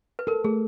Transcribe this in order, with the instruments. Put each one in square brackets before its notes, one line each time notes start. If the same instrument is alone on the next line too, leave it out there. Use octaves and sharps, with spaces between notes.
[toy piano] B4
[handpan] A4 [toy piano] A#4
[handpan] A3 [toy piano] G#4